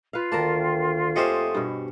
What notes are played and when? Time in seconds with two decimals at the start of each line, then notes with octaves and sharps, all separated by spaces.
0.13 F4 B4 F5
0.32 D2 D#3 A#3 A#4 A5
1.16 F2 A3 C#4 G4 C5 D#5 F5 D#6
1.55 G2 B2